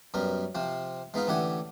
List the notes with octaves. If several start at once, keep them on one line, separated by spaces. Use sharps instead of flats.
F#2 B2 G3 A#4
C3 F3 C4
G#3 B3 D#4 F4
A1 D3 E3 G4 F#5 G#5